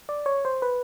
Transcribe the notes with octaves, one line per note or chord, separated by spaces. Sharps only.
D5
C#5
C5
B4